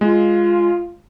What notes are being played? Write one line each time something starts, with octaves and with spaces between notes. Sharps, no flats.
G#3 F4